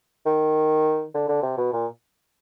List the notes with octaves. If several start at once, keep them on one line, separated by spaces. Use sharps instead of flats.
D#3
D3
D3
C3
B2
A#2